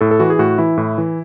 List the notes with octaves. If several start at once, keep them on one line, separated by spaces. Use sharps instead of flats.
A2 A4
A4
E3 F#4
G#4
A2 F#4
E3 E4
A2
E3